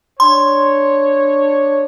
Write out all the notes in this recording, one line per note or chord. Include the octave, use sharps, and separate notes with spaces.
D4 C#5 C6